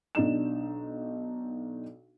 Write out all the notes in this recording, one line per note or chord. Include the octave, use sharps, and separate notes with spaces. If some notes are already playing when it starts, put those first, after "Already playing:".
B1 D4 D#4 E7